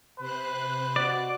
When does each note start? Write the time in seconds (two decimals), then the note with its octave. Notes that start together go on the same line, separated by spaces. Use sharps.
0.19 C3 B4 C5 F#6
0.96 F#4 D5 D#5